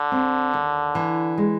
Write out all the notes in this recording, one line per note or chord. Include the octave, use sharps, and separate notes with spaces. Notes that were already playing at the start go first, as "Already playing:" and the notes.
Already playing: D3
C4
D#2
E3
G#3